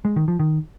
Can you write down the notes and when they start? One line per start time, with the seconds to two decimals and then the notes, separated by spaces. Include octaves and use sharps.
0.05 G#3
0.16 D#3
0.28 F3
0.39 D#3